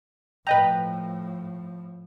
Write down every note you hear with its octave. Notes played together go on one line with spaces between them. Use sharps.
A2 F3 B4 D#5 G5 A#5 G6